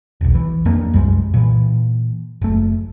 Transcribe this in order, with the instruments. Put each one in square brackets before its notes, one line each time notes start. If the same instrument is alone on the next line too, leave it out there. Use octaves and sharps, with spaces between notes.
[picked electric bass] E1 B1
E3
F2 E3 A#3 D4
C2 F#2 G3 G#3
A#2 E3
F#1 A3